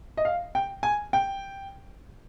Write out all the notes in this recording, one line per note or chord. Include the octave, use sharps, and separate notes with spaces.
D#5
F5
G5
G#5
G5